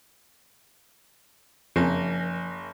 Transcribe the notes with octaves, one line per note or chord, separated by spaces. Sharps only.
F#1 F2 F3 G#5 A#6